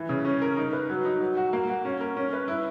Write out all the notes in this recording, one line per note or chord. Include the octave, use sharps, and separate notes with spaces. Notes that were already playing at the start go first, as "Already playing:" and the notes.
Already playing: E3
C#3
C#4
A#4
D#4
B4
F#3
D#4
F#3
F#4
A#3
F#4
C#4
A#4
C#4
B4
E4